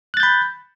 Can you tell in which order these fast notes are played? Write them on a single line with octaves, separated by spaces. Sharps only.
F#6 A6 G6 B5